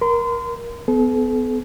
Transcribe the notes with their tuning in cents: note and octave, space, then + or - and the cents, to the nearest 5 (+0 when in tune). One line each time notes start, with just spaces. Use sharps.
A#4 +20 C6 -35
B3 +30 A4 -40